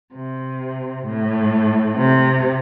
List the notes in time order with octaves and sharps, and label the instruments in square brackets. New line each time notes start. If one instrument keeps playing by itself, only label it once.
[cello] C3
A2
C3